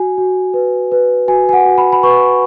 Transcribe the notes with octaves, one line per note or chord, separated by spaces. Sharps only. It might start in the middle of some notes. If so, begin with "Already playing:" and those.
Already playing: F#4 G#5
F#4
B4
B4
F#4 G#5
G#5
F#5
F#4
B5
B5
B4 C#6